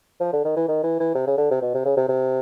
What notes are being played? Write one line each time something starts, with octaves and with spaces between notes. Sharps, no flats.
F3
D3
D#3
E3
D#3
E3
E3
C3
C#3
D3
C3
B2
C3
C#3
C3
C3